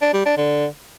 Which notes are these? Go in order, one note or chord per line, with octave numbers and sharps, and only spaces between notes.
D4
G3
D4
D3